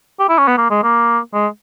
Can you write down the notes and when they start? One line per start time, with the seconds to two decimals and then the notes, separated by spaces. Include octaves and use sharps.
0.20 G4
0.29 E4
0.38 C#4
0.48 B3
0.58 A#3
0.70 G#3
0.83 A#3
1.34 G#3